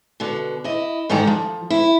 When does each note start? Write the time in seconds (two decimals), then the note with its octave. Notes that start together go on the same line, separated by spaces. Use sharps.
0.20 B2 D3
0.64 E4 D#5
1.09 G#2 D3 D#3 G3 F#5 A#5
1.27 F3
1.70 E4